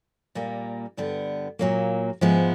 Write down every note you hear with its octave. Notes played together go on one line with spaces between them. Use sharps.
A#2 G3 A#3
G2 D3 G3 B3
A#2 F#3 A#3
G#2 F3 G#3 B3 E4